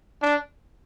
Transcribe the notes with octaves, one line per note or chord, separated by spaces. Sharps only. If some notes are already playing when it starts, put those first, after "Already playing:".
D4